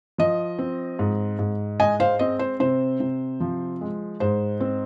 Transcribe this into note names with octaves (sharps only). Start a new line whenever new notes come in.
F3 D#5
C4
G#2
G#2
G#3 D#5 G#5
C5 F5
C4 D#5
C5
C3 C5
C3
F3
G#3
G#2 C5
C4